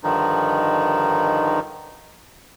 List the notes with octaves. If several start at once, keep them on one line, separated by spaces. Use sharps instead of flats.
G2 D3 D#3 F3 D#4